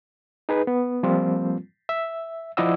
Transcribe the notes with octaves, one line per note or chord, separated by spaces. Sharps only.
D#4 G#4 B4
B3
F3 G3 A#3 C4 F4
E5
F3 E4 D5 D#5 F#5 E6